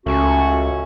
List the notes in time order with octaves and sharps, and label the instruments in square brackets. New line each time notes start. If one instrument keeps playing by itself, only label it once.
[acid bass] C#2 [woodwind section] A3 C#4 F#4